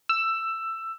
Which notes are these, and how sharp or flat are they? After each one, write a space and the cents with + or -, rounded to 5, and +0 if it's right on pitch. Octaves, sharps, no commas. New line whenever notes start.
E6 +15